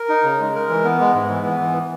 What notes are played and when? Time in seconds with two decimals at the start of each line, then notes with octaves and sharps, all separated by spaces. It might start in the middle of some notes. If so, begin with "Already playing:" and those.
Already playing: A#4
0.09 D#4
0.24 C#3
0.40 G#3
0.54 A#4
0.69 E3
0.84 B3
1.00 G#3
1.15 G#2
1.30 E3
1.46 B3
1.60 E3